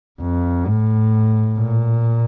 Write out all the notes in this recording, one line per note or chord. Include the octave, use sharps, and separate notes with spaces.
F2
A2
A#2